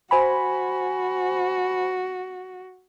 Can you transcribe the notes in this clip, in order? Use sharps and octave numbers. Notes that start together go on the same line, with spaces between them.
F#4 C5 G#5 B5